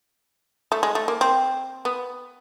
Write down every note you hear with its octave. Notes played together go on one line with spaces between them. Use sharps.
A3
G#3
A3
A#3
C4
B3